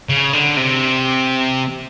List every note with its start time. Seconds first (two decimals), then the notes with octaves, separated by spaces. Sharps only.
0.09 C#3
0.33 D3
0.57 C3